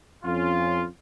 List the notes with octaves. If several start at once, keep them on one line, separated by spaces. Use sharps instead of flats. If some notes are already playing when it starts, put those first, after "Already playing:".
F2 C#4 F4